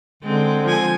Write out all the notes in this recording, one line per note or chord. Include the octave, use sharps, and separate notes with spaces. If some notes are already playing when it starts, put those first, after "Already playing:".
D3 G#3 C4
F3 G#5